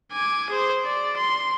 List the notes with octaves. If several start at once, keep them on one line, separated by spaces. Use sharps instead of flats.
G#5 D6
G#4 C5
D5
C6